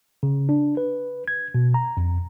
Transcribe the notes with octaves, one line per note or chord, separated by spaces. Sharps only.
C#3
D4
B4
G#6
B2
A#5
F2